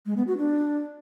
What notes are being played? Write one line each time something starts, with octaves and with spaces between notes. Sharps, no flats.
G#3
B3
F#4
D4